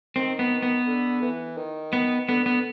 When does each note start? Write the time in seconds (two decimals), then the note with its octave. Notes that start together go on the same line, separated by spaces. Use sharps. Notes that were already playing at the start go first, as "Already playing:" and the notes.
0.16 D#3 C4
0.39 B3
0.63 B3
0.87 D3
1.22 E3
1.57 D#3
1.93 B3
2.28 D3 B3
2.46 B3